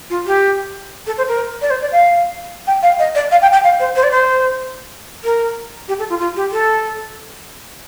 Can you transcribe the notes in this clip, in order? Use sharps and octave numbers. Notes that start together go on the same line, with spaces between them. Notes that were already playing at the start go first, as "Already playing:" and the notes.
F4
G4
A4
C5
A#4
D5
C5
D5
F5
G5
F5
D#5
D5
F5
G5
G5
F5
C5
C5
D5
C5
A#4
G4
A4
F4
F4
G4
A4